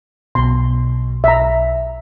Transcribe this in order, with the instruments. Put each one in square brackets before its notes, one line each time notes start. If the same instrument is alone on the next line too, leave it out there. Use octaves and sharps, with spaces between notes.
[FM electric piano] B1 B2 [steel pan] C6
[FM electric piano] B1 [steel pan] E5 A#5